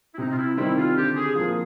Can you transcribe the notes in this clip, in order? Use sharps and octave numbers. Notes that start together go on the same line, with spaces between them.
E4
C3 D#4
F4
E4
D#3 G3 C4 E4
F4
D3 G4
G#4
F3 A#3 G#4